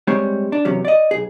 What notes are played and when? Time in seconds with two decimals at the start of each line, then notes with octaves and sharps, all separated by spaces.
0.07 G3 G#3 C4 C5 C#5
0.52 D4
0.65 E2 C3 F#3 C#4
0.85 D5 D#5
1.11 B1 G#4